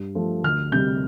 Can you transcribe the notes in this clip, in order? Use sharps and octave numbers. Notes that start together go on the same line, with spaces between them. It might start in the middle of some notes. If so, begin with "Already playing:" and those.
Already playing: G2
F3 A3
D2 F6
C3 G3 G6